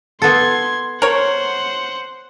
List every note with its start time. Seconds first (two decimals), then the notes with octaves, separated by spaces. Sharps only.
0.22 B3 A4 C6 G#6
1.02 A#4 C5 C#5 F#5